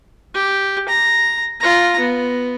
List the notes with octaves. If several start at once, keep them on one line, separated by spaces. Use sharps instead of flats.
G4
A#5
F4 A#5
B3